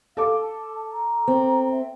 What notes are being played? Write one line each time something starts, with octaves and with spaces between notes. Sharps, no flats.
A4 F5 D6
A5
A#5
C4
E5